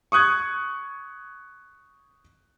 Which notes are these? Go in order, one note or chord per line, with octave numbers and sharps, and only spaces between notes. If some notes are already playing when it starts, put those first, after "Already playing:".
C#6 D#6 F#6 G#6